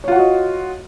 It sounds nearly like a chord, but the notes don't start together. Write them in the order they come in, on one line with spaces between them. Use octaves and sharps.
C#5 F4 F#5 F#4 D#5